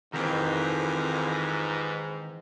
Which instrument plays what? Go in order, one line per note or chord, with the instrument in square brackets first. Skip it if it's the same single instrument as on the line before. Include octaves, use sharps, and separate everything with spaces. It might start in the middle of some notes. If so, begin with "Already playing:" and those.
[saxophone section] F2 [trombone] G#2 [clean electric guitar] D#3 E3 C4 [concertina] G4 B4 A#5